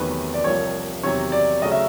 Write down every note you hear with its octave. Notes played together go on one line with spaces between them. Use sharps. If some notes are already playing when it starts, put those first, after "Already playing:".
Already playing: E2 C3 D#3 F#3 A3 B4
D5
C2 C3 F3 A#3 C#5
E2 C3 D#3 F#3 C#5
D5
C#3 F#3 A3 D#5
E5